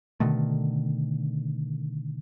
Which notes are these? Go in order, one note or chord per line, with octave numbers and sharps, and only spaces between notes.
B2 D3 D#3 A3